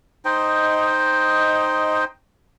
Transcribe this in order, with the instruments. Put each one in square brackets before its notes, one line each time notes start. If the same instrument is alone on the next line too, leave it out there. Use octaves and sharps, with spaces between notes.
[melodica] D#4 C5 D#5 G5